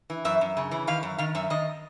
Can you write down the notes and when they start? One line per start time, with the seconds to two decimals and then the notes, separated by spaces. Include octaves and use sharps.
0.10 E3
0.25 F#2 E5
0.41 F#2
0.57 C#3
0.71 E3
0.87 D#3 F5
1.03 F#2
1.18 D#3 F5
1.35 F#2 E5
1.50 D#3 D#5